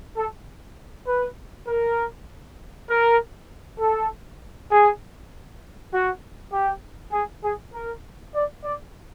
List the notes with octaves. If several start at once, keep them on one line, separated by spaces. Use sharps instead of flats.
A4
B4
A#4
A#4
A4
G#4
F#4
G4
G#4
G#4
A#4
D5
D5